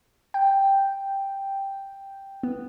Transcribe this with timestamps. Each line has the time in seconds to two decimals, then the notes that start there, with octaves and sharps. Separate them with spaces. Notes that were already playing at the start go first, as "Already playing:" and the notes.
0.34 G5
2.43 B3